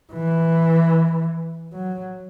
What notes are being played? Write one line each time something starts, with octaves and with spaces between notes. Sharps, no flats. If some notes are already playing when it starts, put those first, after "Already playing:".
E3
F#3